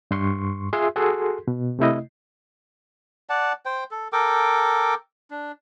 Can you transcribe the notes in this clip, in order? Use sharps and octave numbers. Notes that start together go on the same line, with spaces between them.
G2 C6 C#6
F4 G#4 E5 C6
F#4 G#4 A4 C6
B2
C3 A3 E4 D#5
D5 F#5 A5
C5 G5
A4
A4 A#4 G5 D6
D4